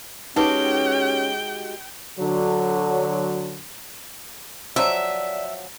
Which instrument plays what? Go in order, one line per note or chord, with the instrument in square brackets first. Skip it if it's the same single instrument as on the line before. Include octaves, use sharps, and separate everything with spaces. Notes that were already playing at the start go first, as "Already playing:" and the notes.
[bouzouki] G#3 F#4 G4 [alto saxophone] C#4 [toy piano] D#4 B4 [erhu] G5
[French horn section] D3 F#3
[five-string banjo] F3 F#3 [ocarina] D5 [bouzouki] E5